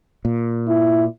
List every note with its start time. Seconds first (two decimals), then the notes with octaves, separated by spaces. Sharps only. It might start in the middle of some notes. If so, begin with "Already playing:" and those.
0.25 A#2
0.68 E4